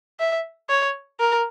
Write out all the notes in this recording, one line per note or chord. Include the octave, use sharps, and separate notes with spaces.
E5
C#5
A#4